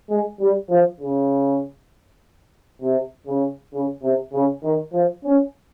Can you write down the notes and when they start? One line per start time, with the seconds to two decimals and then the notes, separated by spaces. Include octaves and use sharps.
0.09 G#3
0.40 G3
0.70 F3
1.00 C#3
2.81 C3
3.26 C#3
3.73 C#3
4.03 C3
4.33 C#3
4.63 D#3
4.93 F3
5.24 C#4